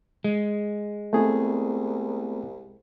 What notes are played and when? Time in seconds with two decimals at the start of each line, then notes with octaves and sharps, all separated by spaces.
0.24 G#3
1.13 C2 A3 B3 C4 E4 G#4